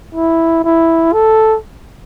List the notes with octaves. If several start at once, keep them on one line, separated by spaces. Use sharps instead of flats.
E4
E4
A4